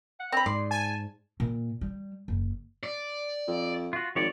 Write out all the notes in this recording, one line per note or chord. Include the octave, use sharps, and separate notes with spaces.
F#5
C4 A#5 B5
G#2 D5 C6
G#5 A5
A#2
G3
F#1
D5
F2
F4 F#4
G#1 F3 C#5 D5